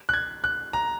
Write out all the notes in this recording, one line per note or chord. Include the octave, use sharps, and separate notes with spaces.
F#6
G#6
F#6
A#5